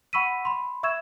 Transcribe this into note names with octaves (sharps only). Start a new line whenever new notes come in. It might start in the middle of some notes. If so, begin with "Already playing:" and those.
F#5 B5 C#6 E6 B6 D#7
B5 C6
E5 C#6 E6 G#6 E7